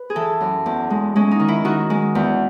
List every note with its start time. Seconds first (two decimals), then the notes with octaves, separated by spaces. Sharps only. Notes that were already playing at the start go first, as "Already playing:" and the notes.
Already playing: B4
0.10 G#4
0.16 E3 A4
0.41 F#2
0.66 E2
0.90 G#3
1.16 G#3 C#4
1.31 D#4
1.40 D#3
1.48 E4
1.65 D#3 F#4
1.90 G#3
2.15 E2